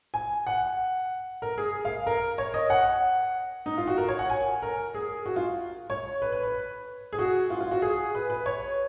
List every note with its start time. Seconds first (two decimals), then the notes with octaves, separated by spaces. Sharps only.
0.14 G#5
0.47 F#5
1.42 A#4
1.58 G#4
1.85 F5
2.07 A#4
2.38 C#5
2.54 D#5
2.70 F#5
3.66 D#4
3.77 F4
3.87 F#4
3.98 A#4
4.08 C#5
4.19 F#5
4.30 G#5
4.62 A#4
4.94 G#4
5.26 F#4
5.36 F4
5.90 C#5
6.22 B4
6.32 B4
6.43 B4
7.13 G#4
7.19 F#4
7.50 F4
7.60 F4
7.71 F#4
7.82 G#4
8.15 B4
8.30 B4
8.46 C#5